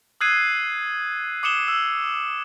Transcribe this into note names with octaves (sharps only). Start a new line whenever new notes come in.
D#6 E6 F#6 G#6 C7 D#7
D6 D#6 C#7 E7 G7
E6